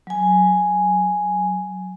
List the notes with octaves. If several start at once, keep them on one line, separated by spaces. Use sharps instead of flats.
F#3 G#5